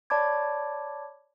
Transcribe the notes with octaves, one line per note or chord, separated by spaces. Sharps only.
C#5 D5 A5 B5 D6 G#6